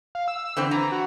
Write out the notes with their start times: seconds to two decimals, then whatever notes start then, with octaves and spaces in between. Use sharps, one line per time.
0.15 F5
0.28 E6
0.57 D3 E3 C4
0.71 E3 A#5
0.92 F#4